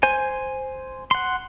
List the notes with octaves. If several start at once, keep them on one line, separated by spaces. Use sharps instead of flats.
C5 G#5
F#5 C6